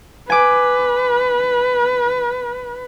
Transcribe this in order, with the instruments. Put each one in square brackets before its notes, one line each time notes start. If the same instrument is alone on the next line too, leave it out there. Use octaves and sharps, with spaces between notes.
[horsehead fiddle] B4 [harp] G#5 D6